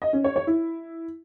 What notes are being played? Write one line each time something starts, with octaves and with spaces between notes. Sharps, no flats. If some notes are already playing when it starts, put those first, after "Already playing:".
D#5
C#4
C#5
C#5
E4